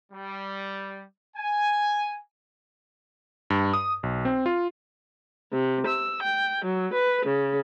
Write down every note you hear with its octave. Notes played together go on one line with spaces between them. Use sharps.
G3
G#5
G2
D#6
B1
C4
F4
C3
E6
G5
F#3
B4
C#3